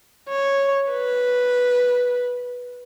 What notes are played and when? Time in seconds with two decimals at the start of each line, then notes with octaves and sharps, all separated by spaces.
0.29 C#5
0.91 B4